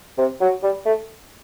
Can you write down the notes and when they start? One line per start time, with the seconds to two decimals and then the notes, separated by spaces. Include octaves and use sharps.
0.18 C3
0.41 F#3
0.63 G3
0.86 A3